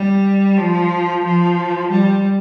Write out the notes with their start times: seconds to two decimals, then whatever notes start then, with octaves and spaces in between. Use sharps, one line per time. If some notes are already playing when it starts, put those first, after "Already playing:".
Already playing: G3
0.58 F3
1.25 F3
1.91 G3